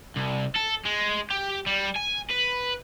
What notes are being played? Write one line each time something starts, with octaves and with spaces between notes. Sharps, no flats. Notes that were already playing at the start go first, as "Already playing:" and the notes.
C2
A4
G#3
G4
G3
G#5
B4